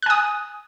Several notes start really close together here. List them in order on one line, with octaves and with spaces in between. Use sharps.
F#6 G#5 D#6